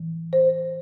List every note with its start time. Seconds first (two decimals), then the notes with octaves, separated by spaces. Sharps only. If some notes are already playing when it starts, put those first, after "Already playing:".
Already playing: A2 E3
0.33 C5